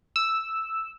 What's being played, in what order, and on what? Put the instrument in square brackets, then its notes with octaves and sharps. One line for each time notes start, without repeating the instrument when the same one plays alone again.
[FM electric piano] E6